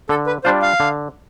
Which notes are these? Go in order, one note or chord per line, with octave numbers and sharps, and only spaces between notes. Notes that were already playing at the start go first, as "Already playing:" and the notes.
D3 A4
B4
G3 D4 F4 C5
F5
D3